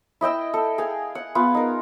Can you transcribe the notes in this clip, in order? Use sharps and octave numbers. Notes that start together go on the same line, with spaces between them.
E4 D#5 G5 E6
A4
G#4 F5 G5 G#5
F#5
B3 F4
D#4 A#4